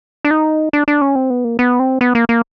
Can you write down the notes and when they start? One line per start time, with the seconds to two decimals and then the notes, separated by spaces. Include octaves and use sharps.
0.25 D4
0.31 D#4
0.73 D4
0.88 D4
1.01 C#4
1.16 C4
1.30 B3
1.44 A#3
1.59 B3
1.80 C4
2.01 B3
2.15 A#3
2.29 A#3